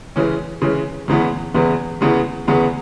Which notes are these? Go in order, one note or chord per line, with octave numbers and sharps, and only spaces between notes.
C#3 E3 G#3 C#4
C#3 E3 G#3 C#4
E2 C#3 E3 G#3 B3
E2 C#3 E3 G#3 B3
E2 C#3 E3 G#3 B3
E2 C#3 E3 G#3 B3